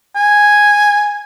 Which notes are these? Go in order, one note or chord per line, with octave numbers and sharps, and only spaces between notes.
G#5